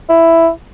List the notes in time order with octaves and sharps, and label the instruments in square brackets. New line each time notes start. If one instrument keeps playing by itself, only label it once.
[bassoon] E4